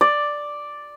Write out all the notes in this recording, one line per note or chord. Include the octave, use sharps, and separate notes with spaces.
D5